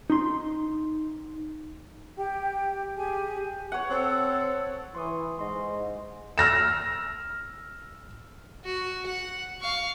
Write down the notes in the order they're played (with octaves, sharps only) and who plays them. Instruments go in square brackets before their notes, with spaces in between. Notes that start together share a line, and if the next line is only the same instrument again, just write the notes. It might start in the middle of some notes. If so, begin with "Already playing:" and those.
[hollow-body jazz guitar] D#4 C6
[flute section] G4 G5
G4 G#4 G#5
[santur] C#5 F#5
[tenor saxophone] C4 [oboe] A4
[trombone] E3 [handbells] C6 C#6 D#6
[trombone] G#2 [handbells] D#5 C6
[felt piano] E6 F6 A#6 E7
[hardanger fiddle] F#4
F#5
F5 C#6